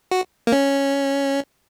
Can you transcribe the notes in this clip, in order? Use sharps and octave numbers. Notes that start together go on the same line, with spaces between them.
F#4
A#3
C#4